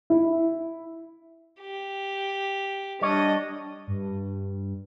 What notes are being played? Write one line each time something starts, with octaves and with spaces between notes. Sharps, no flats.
E4
G4
G3 D4 C#5 D#5
G2